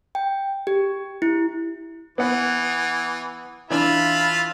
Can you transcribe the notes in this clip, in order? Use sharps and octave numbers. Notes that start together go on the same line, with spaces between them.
G5
G4
E4
E3 B3 F#5
E3 D4 F4 E5 B5